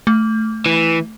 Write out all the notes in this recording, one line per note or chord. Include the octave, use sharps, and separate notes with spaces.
A3
E3